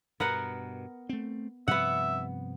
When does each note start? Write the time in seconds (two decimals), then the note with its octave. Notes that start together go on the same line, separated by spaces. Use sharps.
0.20 G2 B2 B3 A#4 F#5
1.09 A3 C4
1.68 G2 C3 F3 B3 E5 F#5